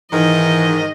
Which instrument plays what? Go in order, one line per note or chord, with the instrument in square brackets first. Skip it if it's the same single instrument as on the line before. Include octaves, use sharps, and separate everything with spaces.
[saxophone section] G#2 D#3 [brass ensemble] E3 [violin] D#5